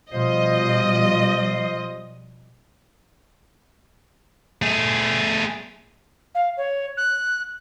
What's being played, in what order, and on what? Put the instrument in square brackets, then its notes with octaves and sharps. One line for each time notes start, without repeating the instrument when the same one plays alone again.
[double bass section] B2 F3 G3 [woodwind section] F4 C5 [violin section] D#5
[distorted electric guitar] A3 G#4
[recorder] F5
C#5
F#6